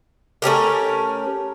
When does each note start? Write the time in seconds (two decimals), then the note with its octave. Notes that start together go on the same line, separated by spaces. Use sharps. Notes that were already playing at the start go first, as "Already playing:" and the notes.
0.42 A3 C#4 G4 A#4